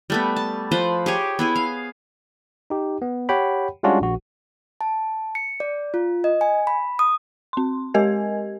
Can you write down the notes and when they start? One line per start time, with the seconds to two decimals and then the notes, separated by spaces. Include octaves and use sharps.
0.10 G3 A3 B3
0.36 A5
0.71 F3 B4 C5
1.06 G4 G#4 C#5
1.39 B3 E4 G#4
1.56 F5
2.70 D#4 G4
3.02 B3
3.29 G4 C#5 F#5 G5 B5
3.83 G3 G#3 C#4 D4 F4 F#4
4.01 A#1 F#4
4.81 A5
5.35 C#7
5.60 D5
5.94 F4
6.24 D#5
6.41 G#5
6.67 B5
6.99 D#6
7.53 C4 C6
7.94 G#3 G4 A#4 D#5 G#5 G#6